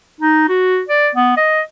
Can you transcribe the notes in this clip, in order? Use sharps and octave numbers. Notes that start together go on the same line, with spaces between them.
D#4
F#4
D5
B3
D#5